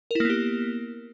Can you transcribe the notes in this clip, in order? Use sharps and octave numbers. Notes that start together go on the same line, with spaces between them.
A#3 B3 E4 G4 A#4